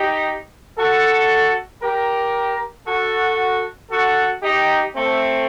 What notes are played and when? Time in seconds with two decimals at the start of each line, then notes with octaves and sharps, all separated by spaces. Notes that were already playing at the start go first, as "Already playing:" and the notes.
Already playing: D#4 G4
0.78 F#4 A4
1.82 G4 A#4
2.87 F#4 A4
3.91 F#4 A4
4.43 D#4 G4
4.95 A3 C4